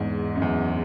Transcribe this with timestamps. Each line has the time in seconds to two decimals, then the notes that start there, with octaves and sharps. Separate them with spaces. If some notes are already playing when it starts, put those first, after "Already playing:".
Already playing: E2 G#2
0.36 F#2
0.42 E2